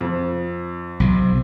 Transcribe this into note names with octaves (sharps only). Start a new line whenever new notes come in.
F2
B1 C3